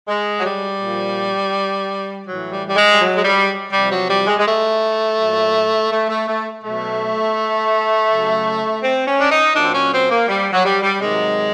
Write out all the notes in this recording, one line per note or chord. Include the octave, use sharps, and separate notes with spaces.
G#3
F#3
G3
A#2 F3
A2 E3 F#3
G3
G3
G#3
G3
F#3
G#3
G3
C3 F3 G3
F#3
G3
G#3
G#3
A3
A#2 F#3
A3
A3
A3
B2 F#3 A3
C#3 F#3
C4
C#4
D4
D#4
A#2 F#3 D4
C4
C#4
C4
A#3
G3
F#3
G3
G3
C3 D#3 F#3 G#3